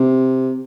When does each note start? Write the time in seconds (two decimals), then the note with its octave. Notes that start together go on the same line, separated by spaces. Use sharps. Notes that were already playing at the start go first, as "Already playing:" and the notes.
Already playing: C3